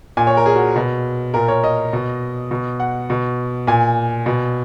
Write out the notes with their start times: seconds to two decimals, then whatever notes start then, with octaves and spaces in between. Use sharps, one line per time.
0.17 A#2 G#5
0.27 C#5
0.37 A#4
0.46 G#4
0.56 F#4
0.76 B2
1.34 A#2 A#4
1.48 C#5
1.64 D#5
1.93 B2
2.51 B2
2.80 F#5
3.10 B2
3.67 A#2 G#5
4.26 B2